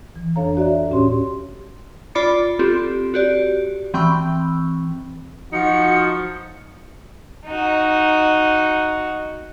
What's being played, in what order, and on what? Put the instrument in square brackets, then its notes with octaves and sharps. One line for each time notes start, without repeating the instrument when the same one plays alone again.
[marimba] E3
F2 D4 A4 C#5 F5 A#5
F#4 D5 E5
D2 A2 C#4 G4 C#5 C6
[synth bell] F4 D5 B5 D6 A6 C#7
C4 F4 G4 A4
F#4 G4 D5
E3 C4 G5 B5 C#6 E6
[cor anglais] F3 [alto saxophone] D#4 [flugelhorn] F#4 [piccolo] C#7
[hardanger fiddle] D#4 F#4